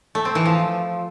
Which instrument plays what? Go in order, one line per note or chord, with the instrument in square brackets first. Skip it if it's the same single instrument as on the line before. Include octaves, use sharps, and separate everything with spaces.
[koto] A3
C4
E3
F3